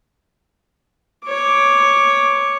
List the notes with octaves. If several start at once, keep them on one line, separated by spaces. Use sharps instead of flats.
C#5 D6